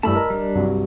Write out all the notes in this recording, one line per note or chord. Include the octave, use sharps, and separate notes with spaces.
G2 E3 A3 A5 B5 E6
A#4 D#5 A#5
G3 D4
C2 G2 F#3